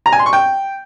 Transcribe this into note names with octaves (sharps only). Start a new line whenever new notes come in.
A#5
G#5
C6
C#6
G5